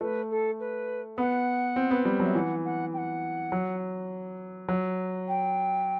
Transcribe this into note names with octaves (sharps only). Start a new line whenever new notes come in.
A3 B4
A4
B4
B3 F#5
C4
B3
G3
F#3 E5
E3 F#5
F#5
G5
F#5
F#3
F#3
G5